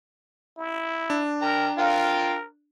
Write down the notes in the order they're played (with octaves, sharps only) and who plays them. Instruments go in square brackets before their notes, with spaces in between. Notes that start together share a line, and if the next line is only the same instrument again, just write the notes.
[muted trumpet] E4
[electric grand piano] D4
[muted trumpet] A#4 [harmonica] G5 A#5
[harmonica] F4 F5 G5 [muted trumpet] A#4